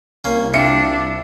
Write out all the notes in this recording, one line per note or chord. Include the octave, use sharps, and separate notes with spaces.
C2 A#3 C#4
D4 F4 E5 G5 C#7